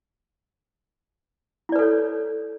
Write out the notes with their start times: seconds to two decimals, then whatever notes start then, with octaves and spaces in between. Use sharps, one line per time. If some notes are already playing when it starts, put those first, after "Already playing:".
1.69 E4
1.72 D5
1.76 B4
1.79 A4
1.82 C#5